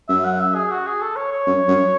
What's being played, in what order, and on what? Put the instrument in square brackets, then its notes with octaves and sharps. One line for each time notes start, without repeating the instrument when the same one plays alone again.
[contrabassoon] F#2 [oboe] E5
[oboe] F#5
E5
G#4
F#4
G#4
A4
C#5
C#5
[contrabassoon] F#2
F#2